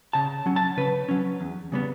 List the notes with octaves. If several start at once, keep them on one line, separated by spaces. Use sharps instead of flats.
C#3 A5
F#3 C#4
A5
C#3 B4
F#3 C#4
E2
C#3 G3 B3